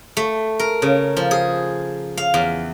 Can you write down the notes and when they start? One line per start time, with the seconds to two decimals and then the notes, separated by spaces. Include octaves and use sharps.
0.17 A3
0.59 A#4
0.82 C#3
1.17 F3
1.31 G#4
2.17 F5
2.34 E2